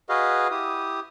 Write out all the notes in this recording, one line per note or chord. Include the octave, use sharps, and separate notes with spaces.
F#4 G#4 B4 D#5 F5
E4 G4 D#6